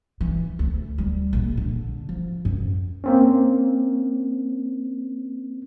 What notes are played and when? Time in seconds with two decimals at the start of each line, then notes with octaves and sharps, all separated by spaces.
0.21 E3
0.59 D2
0.98 G3
1.33 A#1
1.57 D3
2.09 F3
2.45 F#2
3.04 A#3 C4 C#4